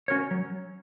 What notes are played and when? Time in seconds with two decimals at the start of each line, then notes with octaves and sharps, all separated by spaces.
0.08 C#4 F#4 A#4 C#5
0.31 F#3